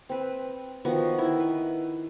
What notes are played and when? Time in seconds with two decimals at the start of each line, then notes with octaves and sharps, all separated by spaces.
0.09 C4 B4
0.85 D#3 F3 B3 F#4
1.18 D#3 E4
1.40 B4